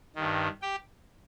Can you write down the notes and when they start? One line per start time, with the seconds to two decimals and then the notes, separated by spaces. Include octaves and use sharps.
0.16 G2 D#3
0.62 G4 G5